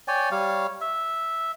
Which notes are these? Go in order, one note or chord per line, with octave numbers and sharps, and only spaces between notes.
C#5 D5 G5 G#5
G3 C#5 F5
E5